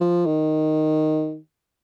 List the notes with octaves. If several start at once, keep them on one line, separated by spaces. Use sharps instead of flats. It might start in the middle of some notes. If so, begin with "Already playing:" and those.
F3
D#3